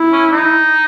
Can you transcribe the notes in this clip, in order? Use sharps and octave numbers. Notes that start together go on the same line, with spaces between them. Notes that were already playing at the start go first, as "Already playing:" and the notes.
Already playing: E4
C#4
D#4